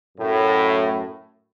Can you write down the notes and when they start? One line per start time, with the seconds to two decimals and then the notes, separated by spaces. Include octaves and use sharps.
0.18 F#2 A2